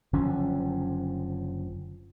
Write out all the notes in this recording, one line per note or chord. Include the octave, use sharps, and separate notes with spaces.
F#1 D3 F3 C#4